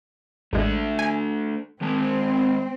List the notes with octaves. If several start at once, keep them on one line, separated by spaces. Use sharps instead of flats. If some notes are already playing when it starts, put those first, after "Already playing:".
A1 G#3 A3 D4
G#5
D#3 G#3 C4 A5